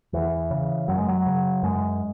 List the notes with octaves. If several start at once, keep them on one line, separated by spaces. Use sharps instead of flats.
E2 E3
C#3
F#2 F#3
G#3
F#3
C#3
F#2 G#3